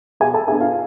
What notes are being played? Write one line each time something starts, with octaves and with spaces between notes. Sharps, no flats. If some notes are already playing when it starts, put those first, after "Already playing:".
B2 G#4 G#5
A4 A5
B3 D4 G#4 G#5
F4 F5